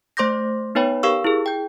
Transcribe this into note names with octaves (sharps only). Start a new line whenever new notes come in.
A3 C5 C6 D6 G6 A#6
B3 D#4 B4 C#5 G5 B5
G4 A#4 F5 C#6 E6
E4 G#4
G5 G6